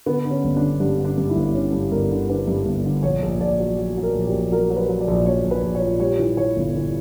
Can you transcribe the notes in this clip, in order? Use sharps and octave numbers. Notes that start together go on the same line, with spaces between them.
D3 B3
D3
C#4
G1
D4
D3
G2 D4
D3
D4
G2
E4
G1
D3 C#4
G2
G1 A#4
D3
D3 B4
G2
G1
D3
A#1 C#5
A#1
A#1 D5
F#3
F#3
F#3
A#4
A#1
G4
A#1
F#3 A#4
F#3
B4
F#3
D5
A#1
A#1 C#5
A#1
B4
A#1
C#5
A#2
G3 C#5
E3
E3 C#5
G1
E3